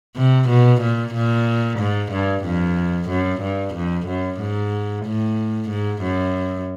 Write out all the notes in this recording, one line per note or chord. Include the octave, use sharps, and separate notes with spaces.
C3
B2
A#2
A#2
G#2
G2
F2
F#2
G2
F2
F#2
G#2
A2
G#2
F#2